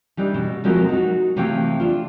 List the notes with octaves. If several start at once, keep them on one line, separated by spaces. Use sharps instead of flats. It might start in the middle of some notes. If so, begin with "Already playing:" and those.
E3 G3 D4 D#4
B2
C3 F3 G#3 A3 F#4 A#4
D#4 F#4
C3 E3 A3 F5 G5
D4 F4